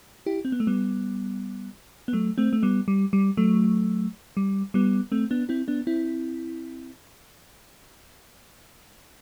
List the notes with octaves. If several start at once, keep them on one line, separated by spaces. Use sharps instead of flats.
E4 G4
C4
B3
A3
G3 B3
B3
F#3 A3
A3 C4
A3
G3 B3
G3
G3
F#3 A3
G3
G3 B3
A3 C4
B3 D4
C4 E4
B3 D4
C4 E4